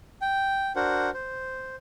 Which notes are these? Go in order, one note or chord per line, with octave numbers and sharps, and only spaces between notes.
G5
D4 F#4 A#4 C5 F#5
C5